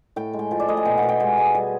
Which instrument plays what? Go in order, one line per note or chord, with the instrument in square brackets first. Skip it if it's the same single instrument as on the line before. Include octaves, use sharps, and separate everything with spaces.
[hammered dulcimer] A2 G5
G#3
G5
F3 G5
D5
A2 D#5
G#5
B2 G5
F#5
B2
G5
G#3 G#5
G#3
G3 G#5